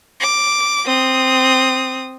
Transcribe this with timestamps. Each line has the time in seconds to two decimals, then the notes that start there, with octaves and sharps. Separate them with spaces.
0.20 D6
0.85 C4 D#6